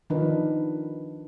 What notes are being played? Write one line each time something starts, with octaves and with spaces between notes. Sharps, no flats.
D#3 F3 D4 D#4 A#4 B4